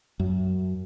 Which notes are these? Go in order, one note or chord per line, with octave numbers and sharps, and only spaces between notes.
F#2